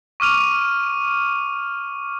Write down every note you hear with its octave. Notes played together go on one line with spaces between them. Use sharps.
C#6 D6 F6 D#7 F7